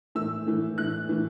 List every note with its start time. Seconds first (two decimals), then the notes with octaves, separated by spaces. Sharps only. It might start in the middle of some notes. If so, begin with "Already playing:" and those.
0.15 A2 E3 E6
0.46 A2 E3
0.78 A2 E3 F#6
1.09 A2 E3